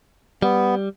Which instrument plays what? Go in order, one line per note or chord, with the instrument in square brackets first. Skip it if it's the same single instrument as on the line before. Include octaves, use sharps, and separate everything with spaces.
[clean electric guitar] G3 [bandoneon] B3